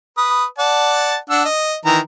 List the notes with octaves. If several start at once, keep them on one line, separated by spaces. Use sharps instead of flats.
B4 D#6
D5 F#5 A5
D4 F#5 E6
D#5
D#3 E3 A#5